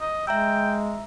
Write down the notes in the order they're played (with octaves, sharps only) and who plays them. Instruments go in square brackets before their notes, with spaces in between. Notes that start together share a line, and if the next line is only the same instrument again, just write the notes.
[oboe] D#5
[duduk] G#3 [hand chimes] E5 A#5 E6 [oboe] G5